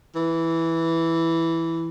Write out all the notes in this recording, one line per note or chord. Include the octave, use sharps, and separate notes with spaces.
E3